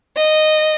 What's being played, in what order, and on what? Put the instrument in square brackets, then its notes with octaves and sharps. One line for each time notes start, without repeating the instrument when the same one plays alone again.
[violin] D#5